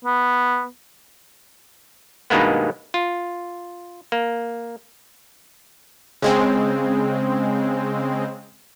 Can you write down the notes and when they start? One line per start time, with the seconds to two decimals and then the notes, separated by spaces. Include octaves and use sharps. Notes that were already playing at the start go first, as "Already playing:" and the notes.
0.05 B3
2.30 G2 B2 D#3 G#3 A#3 B3
2.94 F4
4.12 A#3
6.22 C#3 G#3 C4